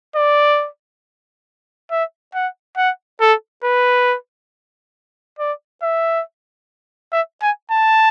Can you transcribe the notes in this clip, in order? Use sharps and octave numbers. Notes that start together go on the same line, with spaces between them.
D5
E5
F#5
F#5
A4
B4
D5
E5
E5
G#5
A5